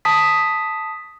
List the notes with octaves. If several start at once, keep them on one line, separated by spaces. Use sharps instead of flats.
A5 D#6 B6